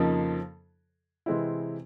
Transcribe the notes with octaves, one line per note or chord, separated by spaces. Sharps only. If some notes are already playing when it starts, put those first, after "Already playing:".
Already playing: F2 C#3 F3 A#3 D#4
C3 E3 G#3 C4 E4